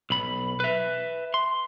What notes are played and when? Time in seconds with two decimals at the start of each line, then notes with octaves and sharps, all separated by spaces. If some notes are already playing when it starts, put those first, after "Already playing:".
0.10 B1 B5
0.60 B4 E5
1.34 C6